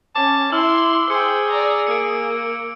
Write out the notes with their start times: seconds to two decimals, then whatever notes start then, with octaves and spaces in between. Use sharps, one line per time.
0.15 C#4 A5 D6
0.52 E4 C6 E6 F6 F#7
1.10 G#4 C5 G5 E6 C#7
1.51 D5 A#5
1.87 A#3 C#7 D7